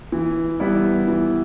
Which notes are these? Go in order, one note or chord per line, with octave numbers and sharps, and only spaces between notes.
E3
G3 B3 E4
E3